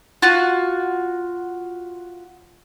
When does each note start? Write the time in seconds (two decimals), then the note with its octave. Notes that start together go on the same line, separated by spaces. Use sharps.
0.22 F4 F#4